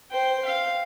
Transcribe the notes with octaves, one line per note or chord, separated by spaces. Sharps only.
C5 G5
F5